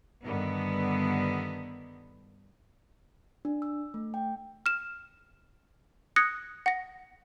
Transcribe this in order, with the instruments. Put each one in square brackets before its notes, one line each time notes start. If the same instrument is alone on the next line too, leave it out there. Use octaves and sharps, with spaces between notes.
[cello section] G2 D3 D#3 B3
[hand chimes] D4
E6
A3
G5
[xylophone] F6 E7
D#6 F#6 G#6 A#6 C#7
F#5 A#6